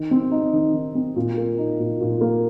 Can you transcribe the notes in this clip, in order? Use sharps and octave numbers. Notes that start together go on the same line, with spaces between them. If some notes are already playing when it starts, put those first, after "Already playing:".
Already playing: D#3
C4
D#4
D#3
D#3
C4
A#2
A#3
D#4
A#2
A#2
A#3